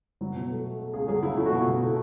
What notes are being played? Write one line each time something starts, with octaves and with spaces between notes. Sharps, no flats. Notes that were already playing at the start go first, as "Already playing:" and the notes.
F#3 E4
B2
A3
A3
A3
C#2 G#4
F#3 G#4
C#2 E4
A3 E4
F#4
B2 E4
B2
A3